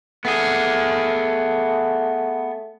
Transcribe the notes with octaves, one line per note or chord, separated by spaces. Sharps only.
A3 B3 G#4